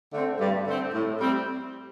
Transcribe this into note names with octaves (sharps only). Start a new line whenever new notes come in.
D3 A3 C4
G2
D3 A3 C4
A2
G3 C4